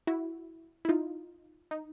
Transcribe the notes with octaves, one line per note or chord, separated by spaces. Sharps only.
E4 F#4
E4
D#4 F4
D#4